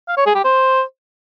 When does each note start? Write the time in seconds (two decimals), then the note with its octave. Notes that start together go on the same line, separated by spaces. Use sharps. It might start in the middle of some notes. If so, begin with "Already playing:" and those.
0.08 F5
0.17 C#5
0.26 G#4
0.35 G4
0.44 C5